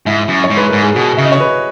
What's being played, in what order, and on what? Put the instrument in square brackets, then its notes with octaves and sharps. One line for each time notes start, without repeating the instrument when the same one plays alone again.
[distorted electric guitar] G#2 [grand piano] E4
[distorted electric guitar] F#2
[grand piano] C#5
[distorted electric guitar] G#2
[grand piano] B4
[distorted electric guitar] G#2 [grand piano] A#4
[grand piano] G#4
[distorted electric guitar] B2 [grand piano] F#4
[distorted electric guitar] C#3 [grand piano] E5
[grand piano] D#5
C#5
B4